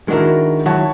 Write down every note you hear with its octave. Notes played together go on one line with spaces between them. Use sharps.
D#3 G#3 D4 E4 F#4 A#4
D#3 F#3 E4 C#5 F#5 A5